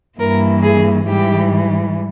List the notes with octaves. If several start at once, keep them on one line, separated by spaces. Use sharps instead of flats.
G2 E3 A#3 A#4
G#4
G#2 E3 G3 G4